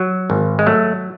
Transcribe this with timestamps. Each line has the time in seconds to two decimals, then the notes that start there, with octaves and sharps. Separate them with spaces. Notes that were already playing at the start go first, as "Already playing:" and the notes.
Already playing: F#3
0.30 G#1
0.59 G#3
0.66 F#3 A3